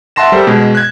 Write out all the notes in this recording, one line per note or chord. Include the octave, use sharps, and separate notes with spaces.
E5 F#5 A5 C6 A#6 E7
G3 A4 A#4 C5
B2 G#3
F#6 G#6